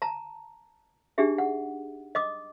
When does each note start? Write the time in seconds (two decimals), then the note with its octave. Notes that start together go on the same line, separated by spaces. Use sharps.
0.02 A5 A#5
1.18 D4 D#4 G4 G#4 E5
1.38 F#5
2.15 D#5 D6 D#6